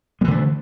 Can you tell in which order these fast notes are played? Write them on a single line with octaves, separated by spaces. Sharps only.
G#3 E3 D3 A3